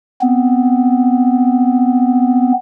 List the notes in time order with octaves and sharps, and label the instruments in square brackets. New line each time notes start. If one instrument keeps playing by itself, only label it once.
[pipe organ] B3 C4